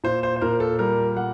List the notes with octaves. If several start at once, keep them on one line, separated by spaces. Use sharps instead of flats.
A#2 C5
C5
C5
A#2 A#4
A4
G3 A#4
G3 F#5